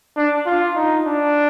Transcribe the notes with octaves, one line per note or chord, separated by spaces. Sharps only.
D4
F4
D#4
D4